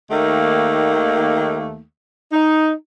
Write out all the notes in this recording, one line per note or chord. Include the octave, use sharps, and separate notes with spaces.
D#2 D#3 A3 A#3
D#4